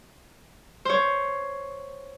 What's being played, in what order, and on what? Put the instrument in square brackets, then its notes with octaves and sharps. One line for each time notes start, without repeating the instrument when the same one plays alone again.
[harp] C5 C#5